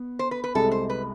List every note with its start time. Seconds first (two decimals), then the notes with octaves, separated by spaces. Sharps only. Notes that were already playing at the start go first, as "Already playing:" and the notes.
Already playing: B3
0.19 C5
0.31 B4
0.44 B4
0.55 C2 C3 G#3 A4
0.72 C5
0.90 B4